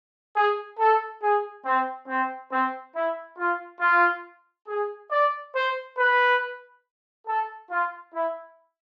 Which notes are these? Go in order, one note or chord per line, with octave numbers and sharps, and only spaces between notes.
G#4
A4
G#4
C4
C4
C4
E4
F4
F4
G#4
D5
C5
B4
A4
F4
E4